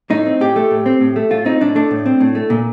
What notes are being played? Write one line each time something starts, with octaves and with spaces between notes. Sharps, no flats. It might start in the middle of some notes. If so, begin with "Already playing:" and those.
A2 D#4
C4
A2 G4
A3
A2
C4
A2
A3
A2 F4
C4 D#4
A2 D4
A3 D4
A2
C4
A2
A3
A#2